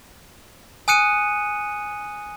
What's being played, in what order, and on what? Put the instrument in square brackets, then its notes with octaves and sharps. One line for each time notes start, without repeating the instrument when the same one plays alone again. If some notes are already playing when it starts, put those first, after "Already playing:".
[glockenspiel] G#5 D#6 F#6 C#7 D#7